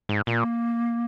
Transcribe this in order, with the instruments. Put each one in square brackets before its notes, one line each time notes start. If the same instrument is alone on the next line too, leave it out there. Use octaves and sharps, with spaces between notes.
[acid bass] G#2
[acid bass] A#2 [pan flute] A#3